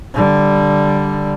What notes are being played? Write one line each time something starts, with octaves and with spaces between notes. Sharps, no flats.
D3 G3